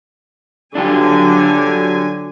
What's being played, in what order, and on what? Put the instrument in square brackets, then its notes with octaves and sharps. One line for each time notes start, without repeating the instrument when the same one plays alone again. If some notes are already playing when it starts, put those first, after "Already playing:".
[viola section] D3 F#3 G#5 [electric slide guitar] D4 F4 G4